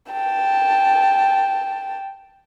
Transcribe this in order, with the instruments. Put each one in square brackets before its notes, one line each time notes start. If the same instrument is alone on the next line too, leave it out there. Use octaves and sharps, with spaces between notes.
[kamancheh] G5 A5